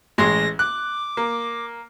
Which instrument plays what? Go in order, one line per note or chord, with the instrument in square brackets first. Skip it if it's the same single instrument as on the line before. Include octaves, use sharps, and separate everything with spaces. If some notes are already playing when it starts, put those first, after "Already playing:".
[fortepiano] A1 G#3 C6 [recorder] A#6
[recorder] D6 [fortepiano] F#6
[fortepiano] A#3